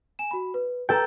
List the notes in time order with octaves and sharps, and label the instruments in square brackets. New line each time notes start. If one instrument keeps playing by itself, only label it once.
[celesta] G#5 E7
F#4 B5
B4
[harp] A4 G5 [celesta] B4 A#5